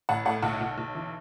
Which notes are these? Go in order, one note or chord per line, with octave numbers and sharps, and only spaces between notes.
A1 F#5
A2 F#5
B1 F#5
B1
B1
E3